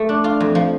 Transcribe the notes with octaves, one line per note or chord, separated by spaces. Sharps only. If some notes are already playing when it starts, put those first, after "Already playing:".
Already playing: A3
D4
F4
F2
F3